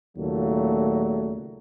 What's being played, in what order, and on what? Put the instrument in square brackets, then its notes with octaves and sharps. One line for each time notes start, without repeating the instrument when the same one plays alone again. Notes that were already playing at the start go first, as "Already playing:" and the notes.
[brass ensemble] D#2 A#2 C#3 F#3 A3